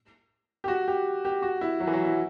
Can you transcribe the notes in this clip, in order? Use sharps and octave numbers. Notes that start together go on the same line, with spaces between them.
G4
F#4
G4
G4
F#4
E4
F#3
E3
F#3
E4